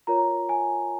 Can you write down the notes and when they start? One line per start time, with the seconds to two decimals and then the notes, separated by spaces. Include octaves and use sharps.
0.07 F4 A#4 C#5 A#5
0.49 G#5